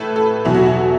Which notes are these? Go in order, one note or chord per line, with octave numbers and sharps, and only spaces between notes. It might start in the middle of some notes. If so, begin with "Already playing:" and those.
Already playing: A2 A3 A4 B4
A4
E2 B2 F#3 E4
F#4
E4